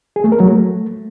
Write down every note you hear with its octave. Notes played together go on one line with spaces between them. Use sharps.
G#4
A3
A#4
F#3
A3